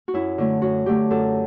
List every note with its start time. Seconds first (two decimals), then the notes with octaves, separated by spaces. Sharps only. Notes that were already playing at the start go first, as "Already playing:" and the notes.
0.08 F#4
0.14 F#2 E4
0.38 D3 F#3 A3
0.62 F#2 F#4
0.86 D3 F#3 A3 G4
1.10 F#2 A4